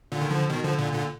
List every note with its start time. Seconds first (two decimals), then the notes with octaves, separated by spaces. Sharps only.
0.12 A#2 D3
0.21 D#3
0.31 D3 F3
0.50 B2 D#3
0.64 D3 F3
0.78 A#2 D3
0.93 A#2 D3